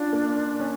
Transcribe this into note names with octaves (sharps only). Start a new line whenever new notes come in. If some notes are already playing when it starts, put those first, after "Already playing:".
Already playing: C#4 D4 F4
A#3
C#4